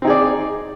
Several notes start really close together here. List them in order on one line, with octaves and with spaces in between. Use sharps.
C4 D#4 G#4 D5